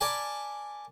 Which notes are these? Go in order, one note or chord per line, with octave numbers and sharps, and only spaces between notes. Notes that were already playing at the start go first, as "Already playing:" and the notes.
A#4 D5 G#5 A5 B5